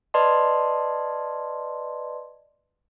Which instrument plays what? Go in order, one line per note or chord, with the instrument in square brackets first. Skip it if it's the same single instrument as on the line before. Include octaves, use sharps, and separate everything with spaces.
[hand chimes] B4 D5 D#5 A5 C6